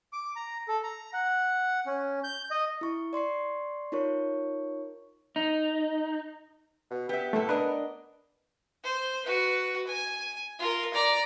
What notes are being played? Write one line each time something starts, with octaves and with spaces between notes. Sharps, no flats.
D6
A#5
A4
A#5
F#5
C#4
G6
D#5
E4 C#6
D5 C6 C#6 C7
D#4 F4 A#4 C#5 C#6
D#4
B2
B3 G4 E5
A2 A3 A#3 A4
D4 A#4 B4 D#5
C5
F#4 B4
G#5
F4 A#4
D5 A#5